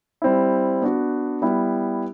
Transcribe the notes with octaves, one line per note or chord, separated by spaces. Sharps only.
G3 C4 E4
B3 D4 F#4
G3 B3 E4